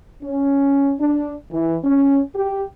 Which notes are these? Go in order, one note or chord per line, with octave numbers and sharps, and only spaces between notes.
C#4
D4
E3
C#4
G4